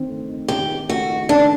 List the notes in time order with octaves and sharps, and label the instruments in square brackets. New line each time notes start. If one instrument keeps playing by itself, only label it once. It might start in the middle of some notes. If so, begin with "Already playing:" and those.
Already playing: [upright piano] D#3 C4
A3
D#4
[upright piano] D#3 [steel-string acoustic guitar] G4
[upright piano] C4
[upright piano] A3 [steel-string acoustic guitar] F#4
[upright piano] D#4
[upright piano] D#3 [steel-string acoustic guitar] D4